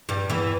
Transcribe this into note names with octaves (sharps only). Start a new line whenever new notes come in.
G2 G3
E2 E3